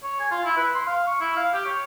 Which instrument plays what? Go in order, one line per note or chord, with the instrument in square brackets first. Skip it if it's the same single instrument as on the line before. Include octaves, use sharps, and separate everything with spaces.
[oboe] C#5
G#5
F4
E4
B4
C6
F5
C#6
E4
F5
G4
C#5